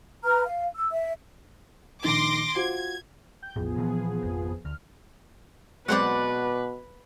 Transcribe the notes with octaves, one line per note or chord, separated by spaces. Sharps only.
B4 A#5 F6
F5
E6
E5
A#1 D#3 C6 D6 A#6
F4 F#4 C5 G#6
G5 G6
A1 E2 A2 F3 B3 G#4
A#2 D3 E3
G#1 F2
D2 F6
B2 F#3 G#3 C4 B4 D5 F#5